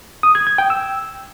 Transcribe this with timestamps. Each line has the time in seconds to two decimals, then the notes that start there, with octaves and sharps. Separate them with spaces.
0.23 D#6
0.35 G#6
0.47 G#6
0.58 G5
0.70 E6